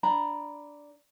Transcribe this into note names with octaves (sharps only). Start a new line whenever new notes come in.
D4 A#5 B5